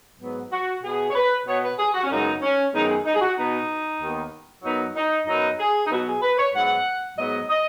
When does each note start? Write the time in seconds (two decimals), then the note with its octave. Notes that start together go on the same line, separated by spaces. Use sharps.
0.20 G#2 F#3 B3
0.51 F#4
0.83 B2 B3 G#4
1.10 C#5
1.15 B4
1.46 B2 B3 C#5
1.62 B4
1.78 G#4
1.94 F#4
2.03 C#4
2.10 F#2 C#3 G#3 B3 D#4
2.42 C#4
2.73 F#2 D#3 G#3 B3 D#4
2.89 G#4
3.05 D#4
3.14 G#4
3.21 F#4
3.37 B2 B3 D#4
4.00 D#2 D#3 B3
4.63 F#2 F#3 B3 D#4
4.96 D#4
5.27 F#2 F#3 B3 D#4
5.59 G#4
5.86 D#4
5.91 B2 F#3 B3 F#4
6.06 G#4
6.22 B4
6.37 C#5
6.54 G#2 F#3 B3 F#5
7.17 G#2 F#3 B3 D#5
7.49 D#5